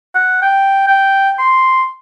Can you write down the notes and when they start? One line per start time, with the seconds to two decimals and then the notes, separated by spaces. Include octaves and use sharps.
0.15 F#5
0.42 G5
0.87 G5
1.39 C6